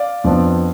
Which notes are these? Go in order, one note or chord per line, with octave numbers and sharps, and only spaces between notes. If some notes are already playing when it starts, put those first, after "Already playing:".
Already playing: D5 F5
F2 F3 B3 D4